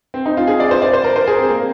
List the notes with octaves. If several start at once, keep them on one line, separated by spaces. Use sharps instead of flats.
C4
D#4
F4
G#4
D5
C5
D5
C5
A#4
C5
G#4
C4
A#3